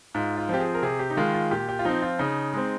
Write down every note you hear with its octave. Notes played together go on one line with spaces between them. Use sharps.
G#2 F4
F4
F3 C4 G4
G#4
A#4
C3 G#4
G4
D#4
D#3 G#3 F4
F4
A#2 G4
G4
F4
F3 C4 D#4
F4
C#3 D#4
G#3 C4